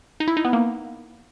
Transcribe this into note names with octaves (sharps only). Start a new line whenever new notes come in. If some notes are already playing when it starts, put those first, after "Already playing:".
D#4
E4
D#4
B3
A#3